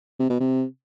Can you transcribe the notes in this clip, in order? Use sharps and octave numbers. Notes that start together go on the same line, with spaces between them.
C3
B2
C3